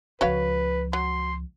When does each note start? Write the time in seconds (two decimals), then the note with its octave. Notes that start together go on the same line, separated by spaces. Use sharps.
0.21 C#2 F3 F#4 B4 C#5 F5
0.93 F#3 C6